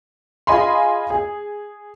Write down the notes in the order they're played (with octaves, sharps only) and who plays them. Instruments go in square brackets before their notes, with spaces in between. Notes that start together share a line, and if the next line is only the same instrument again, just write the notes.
[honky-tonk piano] F4 G#4 D#5 G#5 B5 C6
G#4